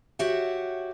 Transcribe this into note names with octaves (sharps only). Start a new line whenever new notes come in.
F#4 G4 C#5 E5 F#5